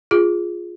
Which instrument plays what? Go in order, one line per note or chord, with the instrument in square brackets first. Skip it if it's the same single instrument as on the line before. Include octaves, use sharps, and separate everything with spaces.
[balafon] F4 G#4